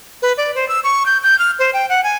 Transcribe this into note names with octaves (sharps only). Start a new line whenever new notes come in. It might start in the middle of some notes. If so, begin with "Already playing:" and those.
B4
D5
C5
E6
C#6
G6
G6
F6
C5
G5
F#5
G#5